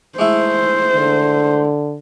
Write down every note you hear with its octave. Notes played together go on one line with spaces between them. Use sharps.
G#3 A3 E4 C5
D3